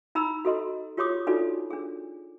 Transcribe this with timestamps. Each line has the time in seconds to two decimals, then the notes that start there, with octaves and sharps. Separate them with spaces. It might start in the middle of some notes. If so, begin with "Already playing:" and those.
0.15 D#4 A#5 B5 E6
0.45 F#4 A4 D#5 C6
0.97 F4 G4 C#5 C6 D6 D#6
1.27 D4 D#4 F4 F#4 A4 D5
1.71 D4 G#4